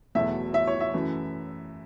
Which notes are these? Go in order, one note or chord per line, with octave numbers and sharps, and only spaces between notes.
E2 B2 F#3 A3 E5
E5
C#5
E5
F#2 E3 A3